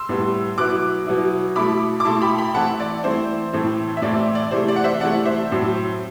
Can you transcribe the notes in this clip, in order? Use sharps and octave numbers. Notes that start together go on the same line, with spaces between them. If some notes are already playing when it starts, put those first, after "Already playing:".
Already playing: C6 E6
A2 G3 B3
B2 F#3 B3 E4 D6 F#6
B2 F#3 B3 E4
B2 A3 E4 B5 D6
D6
B2 A3 E4 A5 C6
G5 B5
G5 B5
E3 A3 C4 E4 F#5 A5
D5
E3 A3 C4 E4 C5
A2 E3 A3 C4
E5
A2 E3 A3 C4 D5
D5
C3 E3 A3 C5
D5
F#5
C5 E5
C3 E3 A3 D5 F#5
C5 E5
A2 F#3 C4